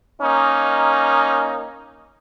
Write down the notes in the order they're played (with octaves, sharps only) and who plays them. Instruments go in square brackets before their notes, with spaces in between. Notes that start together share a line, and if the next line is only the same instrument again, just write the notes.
[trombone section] A#3 C#4 D#4